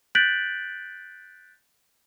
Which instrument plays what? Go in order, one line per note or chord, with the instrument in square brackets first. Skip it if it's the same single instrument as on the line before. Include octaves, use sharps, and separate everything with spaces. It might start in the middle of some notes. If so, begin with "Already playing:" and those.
[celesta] F#6 G6 A6 B6 D7 F#7